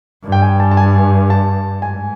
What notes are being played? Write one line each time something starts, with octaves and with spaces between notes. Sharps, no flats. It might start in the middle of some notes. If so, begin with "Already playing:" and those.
G2
G5
G#5
A5
A5
G#5
A5
G#2 G#5